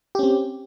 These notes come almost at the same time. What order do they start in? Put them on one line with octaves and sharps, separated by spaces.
G4 C#4 C4